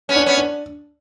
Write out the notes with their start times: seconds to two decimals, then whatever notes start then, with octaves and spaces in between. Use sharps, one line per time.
0.09 B3 C#4
0.16 D4
0.26 B3 C#4
0.38 D4